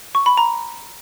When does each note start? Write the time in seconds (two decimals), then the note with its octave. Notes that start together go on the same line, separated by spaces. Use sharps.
0.15 C#6
0.26 B5
0.37 A#5